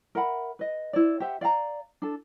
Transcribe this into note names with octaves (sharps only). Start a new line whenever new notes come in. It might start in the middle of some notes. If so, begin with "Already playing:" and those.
A#4 E5 F#5 B5
B4 D#5
E4 C5 D5
G4 C5 E5 F#5
D5 F5 F#5 A#5
D4 A4